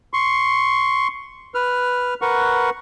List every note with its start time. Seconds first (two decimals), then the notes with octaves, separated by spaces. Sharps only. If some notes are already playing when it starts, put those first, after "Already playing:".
0.13 C6 C#6
1.55 B4 F6
2.22 A#4 B4 F#5 C#6